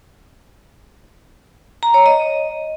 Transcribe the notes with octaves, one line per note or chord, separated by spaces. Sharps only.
A#5
C#5
D#5